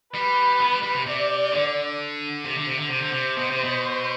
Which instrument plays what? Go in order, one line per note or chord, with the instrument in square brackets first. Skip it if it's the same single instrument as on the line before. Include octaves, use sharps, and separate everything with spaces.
[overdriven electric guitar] G3 [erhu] B4
[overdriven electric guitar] B3
G3
G3
C3
[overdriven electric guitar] C3 [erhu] D5
[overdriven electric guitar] D3
C3
D3
C3
D3
[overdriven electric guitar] C3 [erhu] C5
[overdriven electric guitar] D3
C3
B2
C3
B2